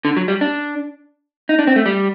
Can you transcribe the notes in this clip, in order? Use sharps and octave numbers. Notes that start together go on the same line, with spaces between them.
D3
F#3
G3
D4
D#4
D4
C4
A3
G3